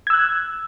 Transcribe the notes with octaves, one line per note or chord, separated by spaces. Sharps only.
E6 F#6 G#6